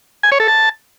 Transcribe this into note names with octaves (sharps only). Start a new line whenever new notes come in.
G#5
C#5
A4
A5